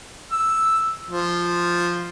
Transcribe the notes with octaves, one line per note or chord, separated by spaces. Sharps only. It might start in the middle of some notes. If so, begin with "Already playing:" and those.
E6
F3